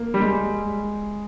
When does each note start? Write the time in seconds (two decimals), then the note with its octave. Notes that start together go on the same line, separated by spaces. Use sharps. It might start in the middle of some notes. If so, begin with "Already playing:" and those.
Already playing: A#3
0.14 G3
0.20 G#3